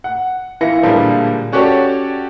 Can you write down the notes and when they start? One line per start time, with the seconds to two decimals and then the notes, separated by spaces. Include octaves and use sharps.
0.04 F#5
0.61 E3 E4 F4 A#6 C#7
0.83 A#2 D3 F3 G3 G#3 A#3
1.52 C#4 F#4 G4 A4 C#5 D5